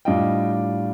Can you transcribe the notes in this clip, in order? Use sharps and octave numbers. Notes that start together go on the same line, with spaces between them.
A2 G3 D4 F4 D#5 G5